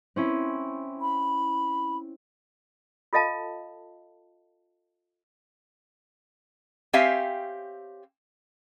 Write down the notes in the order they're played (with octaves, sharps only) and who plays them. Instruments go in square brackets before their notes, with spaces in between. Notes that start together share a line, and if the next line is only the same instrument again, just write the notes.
[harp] C4 C#4 E4
[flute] B5
[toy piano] F4 A4 D#5 F5 A5
[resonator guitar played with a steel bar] C4 G4 C#5 E5 F5 G#5